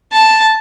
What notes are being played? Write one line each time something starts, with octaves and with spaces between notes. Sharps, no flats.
A5